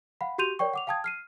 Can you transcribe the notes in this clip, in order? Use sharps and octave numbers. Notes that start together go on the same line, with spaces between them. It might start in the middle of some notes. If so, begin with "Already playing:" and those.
F5 F#5 B5
F#4 G4 C6 G6 D#7 F7
A#4 C#5 D5 G5 C#6
F#5 D6 F7
F5 G5 A5 D#6 G#6
F6 C7 D#7